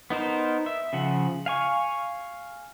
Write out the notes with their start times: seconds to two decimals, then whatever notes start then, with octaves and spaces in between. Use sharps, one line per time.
0.10 B3 D#4 A#4 C5
0.66 E5
0.93 C#3 F3 F#5
1.46 F5 G#5 C#6